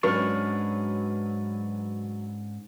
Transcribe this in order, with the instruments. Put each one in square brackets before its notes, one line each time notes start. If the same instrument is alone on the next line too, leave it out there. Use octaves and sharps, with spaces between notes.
[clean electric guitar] G#2 C#4 D4 [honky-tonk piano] F#3 B4 F6 [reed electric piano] C#6